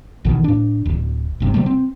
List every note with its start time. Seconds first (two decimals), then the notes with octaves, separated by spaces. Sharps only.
0.25 G#1 B2 D#3 E3
0.44 A2 D4
0.86 D1
1.40 F#1 G2 C3
1.54 C3 F#3 G3 A3
1.66 C4